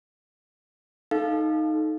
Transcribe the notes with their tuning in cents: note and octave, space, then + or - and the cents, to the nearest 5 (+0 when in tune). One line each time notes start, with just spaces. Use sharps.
D#4 +0 A4 -15 F5 +0